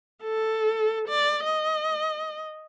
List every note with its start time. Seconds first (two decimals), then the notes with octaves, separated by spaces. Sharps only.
0.23 A4
1.09 D5
1.44 D#5